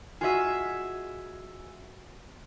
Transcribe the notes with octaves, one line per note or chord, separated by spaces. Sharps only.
F4 F#4 G#4 D#5 E5